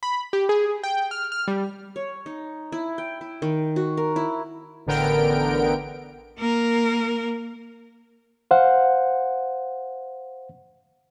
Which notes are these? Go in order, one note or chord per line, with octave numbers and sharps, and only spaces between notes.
B5
G4
G#4
G5
F6
F6
G3
C#5
D#4
E4
G5
E4
D#3
F#4
A#4
E4
A1 D3 B3 A#4 G5 D7
A#3 A#4
C5 F5 F#5